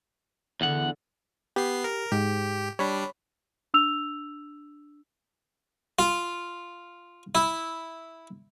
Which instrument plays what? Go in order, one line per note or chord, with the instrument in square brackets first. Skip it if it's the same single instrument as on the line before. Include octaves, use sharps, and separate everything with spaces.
[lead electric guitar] E2 F#5 [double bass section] D3
[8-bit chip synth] B3 C7 [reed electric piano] G4
[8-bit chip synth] A#4
[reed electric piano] G#2 [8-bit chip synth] G4
[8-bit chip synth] G3 D4 [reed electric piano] C#5 B5
[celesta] D4 E6 F7
[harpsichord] F4
E4